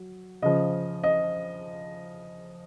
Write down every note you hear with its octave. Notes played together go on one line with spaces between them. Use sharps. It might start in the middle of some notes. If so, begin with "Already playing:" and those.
Already playing: F#3
C#3 F3 D#5
D#5